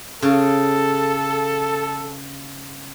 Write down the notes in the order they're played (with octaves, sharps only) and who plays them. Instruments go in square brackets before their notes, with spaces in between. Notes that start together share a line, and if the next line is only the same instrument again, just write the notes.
[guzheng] C#3 [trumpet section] A4